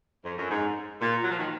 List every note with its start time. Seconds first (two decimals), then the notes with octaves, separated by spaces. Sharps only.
0.24 F2
0.37 F#2
0.49 G#2
1.01 A#2
1.22 F#3
1.30 F3
1.38 D#3